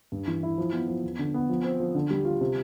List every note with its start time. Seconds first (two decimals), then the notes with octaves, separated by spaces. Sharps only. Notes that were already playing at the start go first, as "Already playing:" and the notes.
0.12 G2
0.28 E3
0.43 E4
0.58 F3
0.72 B3
0.88 F3
1.03 E2
1.19 D3
1.34 B3
1.49 F3
1.64 C4
1.80 F3
1.95 D3
2.11 G3
2.25 F4
2.41 C3